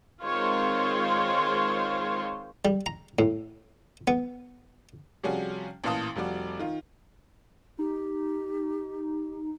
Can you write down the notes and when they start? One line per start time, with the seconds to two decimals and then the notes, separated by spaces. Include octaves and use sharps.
0.23 D#3 G#3 C4 F4 C5 C#5
2.65 G3
2.86 A#5
3.19 A2
4.08 B3
5.23 C3 F3 G3 C#4 F#4 G#4
5.84 A1 A#2 E3 F5 A5 D#6
6.15 F1 F3 G3 F#4 D5
6.60 D#3 F4
7.79 D#4 G4